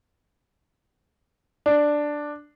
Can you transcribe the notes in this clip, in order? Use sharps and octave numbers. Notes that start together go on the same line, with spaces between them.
D4